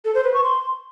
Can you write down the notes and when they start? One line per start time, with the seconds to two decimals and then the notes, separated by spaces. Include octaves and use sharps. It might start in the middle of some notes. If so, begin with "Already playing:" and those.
0.05 A4
0.14 C5
0.24 B4
0.34 C#6
0.43 C6